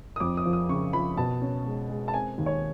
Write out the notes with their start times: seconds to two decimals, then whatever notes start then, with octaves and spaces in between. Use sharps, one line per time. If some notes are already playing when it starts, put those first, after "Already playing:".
0.16 D#6
0.20 F2 D6
0.37 D#6
0.46 F3
0.53 D#6
0.69 C#3 C#6
0.93 F3 B5
1.17 B2 A5
1.41 C#4
1.66 G#3
1.89 G#3
2.08 A5
2.14 C4 G#5
2.38 D#2
2.46 C#5